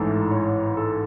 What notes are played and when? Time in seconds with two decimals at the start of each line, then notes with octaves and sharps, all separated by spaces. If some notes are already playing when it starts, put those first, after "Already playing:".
Already playing: A1 G#2 E3 A4
0.31 C#5
0.77 A4